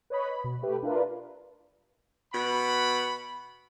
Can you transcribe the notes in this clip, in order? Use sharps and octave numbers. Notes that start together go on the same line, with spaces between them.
B4 C#5 D#5 B5
B5
B2
A3 G4 B4
D4 E4 F4 A#4 B4
B2 F#5 B5